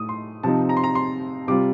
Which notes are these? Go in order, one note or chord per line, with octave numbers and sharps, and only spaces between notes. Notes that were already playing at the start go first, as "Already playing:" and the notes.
Already playing: A2 A3 D#4 D#6
C6
C3 F3 C4 D#4 A5
A#5
C6
A#5
C6
C3 G3 C4 F4 D6